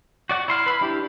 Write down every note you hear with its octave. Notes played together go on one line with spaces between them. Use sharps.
F#4 D5 F#5
E4 C6 F6
B4 B5
D4 E4 G4